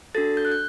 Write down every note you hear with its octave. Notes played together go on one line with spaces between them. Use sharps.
D4 F#4 A4 A6
G6
F#6
G6